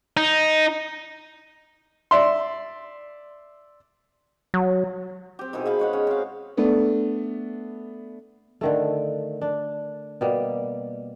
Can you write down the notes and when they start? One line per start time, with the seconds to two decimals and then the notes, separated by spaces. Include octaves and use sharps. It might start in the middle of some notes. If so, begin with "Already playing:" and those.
0.17 D#4
2.11 D5 E5 C6
4.54 F#3
5.39 C4 G4
5.53 B2 D#3 E4 G#4
5.66 B2 F5 B5
5.79 G#3 C#5 F#5
5.93 C#4
6.07 C4 F5
6.57 A3 B3 D4
8.61 D3 D#3 A3
9.41 D4
10.21 B2 G3 A#3